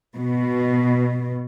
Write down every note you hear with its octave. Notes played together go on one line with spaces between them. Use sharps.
B2